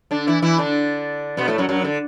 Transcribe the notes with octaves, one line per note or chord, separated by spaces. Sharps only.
D3 D4
E3 E4
E3 E4
D3 D4
B2 B3
A2 A3
F#2 F#3
F#2 F#3
D3